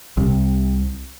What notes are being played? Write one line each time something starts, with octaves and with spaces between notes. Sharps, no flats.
C2 C3